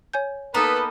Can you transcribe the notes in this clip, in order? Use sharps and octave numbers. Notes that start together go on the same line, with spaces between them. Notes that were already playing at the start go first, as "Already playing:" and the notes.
C#5 G#5 G6
A#3 B3 D#4 A4 B4 A#5